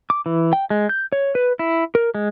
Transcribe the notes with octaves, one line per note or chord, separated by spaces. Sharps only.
D6
E3
G5
G#3
G6
C#5
B4
E4
A#4
G#3